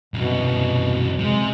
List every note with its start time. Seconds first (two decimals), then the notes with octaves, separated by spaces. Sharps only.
0.14 C2 F#2 B2
1.19 C3 G#3